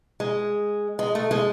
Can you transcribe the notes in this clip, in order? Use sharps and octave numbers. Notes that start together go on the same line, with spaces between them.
G#3
G#3
A3
G#3